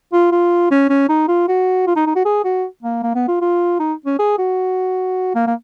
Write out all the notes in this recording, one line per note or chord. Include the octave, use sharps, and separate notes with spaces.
F4
F4
C#4
C#4
D#4
F4
F#4
F4
D#4
D#4
F#4
G#4
F#4
A#3
A#3
B3
F4
F4
D#4
C#4
G#4
F#4
A#3
A#3